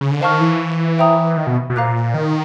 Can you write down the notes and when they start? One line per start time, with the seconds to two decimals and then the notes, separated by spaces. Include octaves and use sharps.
0.01 C#3
0.11 D3
0.21 D#3 C5 F5 A5 C#6 F6
0.41 E3
0.99 C5 E5 G5 A#5 D#6
1.37 D#3
1.47 B2
1.70 B2
1.76 A#2 C5 F5 A#5 D6 F#6
2.14 D#3